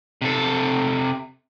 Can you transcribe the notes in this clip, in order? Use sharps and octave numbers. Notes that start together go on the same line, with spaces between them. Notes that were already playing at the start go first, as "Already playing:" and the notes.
C3 A4